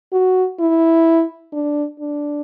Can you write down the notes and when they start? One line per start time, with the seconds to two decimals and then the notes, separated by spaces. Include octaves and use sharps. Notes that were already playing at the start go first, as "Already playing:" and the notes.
0.13 F#4
0.60 E4
1.53 D4
2.00 D4